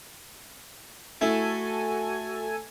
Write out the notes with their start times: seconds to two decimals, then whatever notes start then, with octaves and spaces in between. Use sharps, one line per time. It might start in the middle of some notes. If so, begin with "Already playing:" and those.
1.21 A3 E4 F#4 A4 G#5